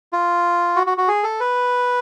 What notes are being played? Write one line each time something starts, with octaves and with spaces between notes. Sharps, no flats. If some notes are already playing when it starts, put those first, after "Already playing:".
F4
F#4
F#4
F#4
G#4
A4
B4